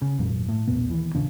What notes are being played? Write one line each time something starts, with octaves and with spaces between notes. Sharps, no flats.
C#3
G#1 F2 A#2 F#3
A2
B1 E2 A#2 B3
D#2 E3
A1 D#2 C#3 D4